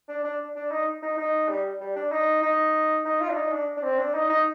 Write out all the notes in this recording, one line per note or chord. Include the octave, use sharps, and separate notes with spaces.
D4
D4
D4
D#4
D#4
D#4
G3
G3
D4
D#4
D#4
D#4
F4
D4
D#4
D4
D4
C4
D4
D#4
D#4